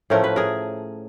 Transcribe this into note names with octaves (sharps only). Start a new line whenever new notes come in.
A2 F3 A3 C#4 A#4
B4
G#4 A#4